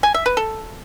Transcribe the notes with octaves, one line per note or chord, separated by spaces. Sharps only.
G#5
E5
B4
A4